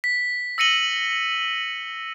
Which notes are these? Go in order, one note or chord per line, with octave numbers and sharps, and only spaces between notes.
B6
E6 A#6 C#7 D#7 F#7 G7